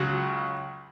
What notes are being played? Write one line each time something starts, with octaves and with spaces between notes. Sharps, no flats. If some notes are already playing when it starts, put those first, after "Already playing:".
Already playing: C#2 C#3 F#3 F#4